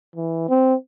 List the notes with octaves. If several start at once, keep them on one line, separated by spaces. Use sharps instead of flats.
E3
C4